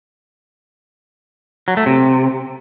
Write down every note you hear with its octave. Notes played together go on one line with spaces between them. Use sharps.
F#3
A3
C3